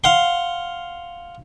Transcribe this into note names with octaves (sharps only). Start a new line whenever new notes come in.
F5 F#5 C6